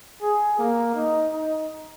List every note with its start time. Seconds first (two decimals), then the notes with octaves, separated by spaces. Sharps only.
0.22 G#4
0.58 A#3
0.95 D#4
1.33 D#4